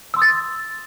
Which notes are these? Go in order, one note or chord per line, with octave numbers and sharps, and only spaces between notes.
C6 D#6 E6 A6